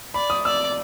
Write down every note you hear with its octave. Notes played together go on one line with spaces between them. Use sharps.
D5 B5
D#6
D5 E6